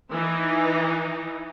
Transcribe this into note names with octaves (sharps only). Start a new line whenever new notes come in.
E3 D#4